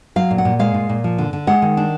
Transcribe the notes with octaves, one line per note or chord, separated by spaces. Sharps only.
F#3 F5
A#2
F#5
A#2
G#3 F5
A#2
A#2
F3
D3
D3
G#3 F#5
D#3
D4